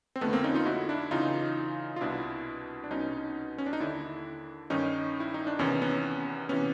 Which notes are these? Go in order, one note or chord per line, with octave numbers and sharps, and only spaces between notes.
C4
F2 D3 A3 B3
A#3 C4
C#4 D#4
D#4 F4
E4 F#4
D4 E4
E2 C#3 E3 D#4 F4
F4
C2 B2 D4 E4
D4
C2 B2 C#4 D#4
C#4
D4
D#4
D#2 D3 D4 E4
G2 D#3 C#4 D#4
E4
D#4
D4
E2 C3 D#3 B3 C#4
B3 C#4
C3 E3 B3 C#4